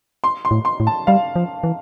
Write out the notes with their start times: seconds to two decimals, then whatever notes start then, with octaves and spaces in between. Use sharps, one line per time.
0.24 C6
0.45 C6
0.51 A2
0.65 C6
0.80 A2
0.87 A5
1.07 G3 F5
1.36 F3
1.64 E3